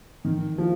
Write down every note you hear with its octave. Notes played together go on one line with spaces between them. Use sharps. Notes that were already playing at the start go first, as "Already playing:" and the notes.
D#3
F3